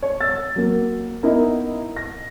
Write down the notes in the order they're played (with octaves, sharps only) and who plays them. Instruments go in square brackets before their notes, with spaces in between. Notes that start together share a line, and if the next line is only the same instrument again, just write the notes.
[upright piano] C#5
E6 A6
F#3 A#3
B3 D#4 E4 A#4
A#6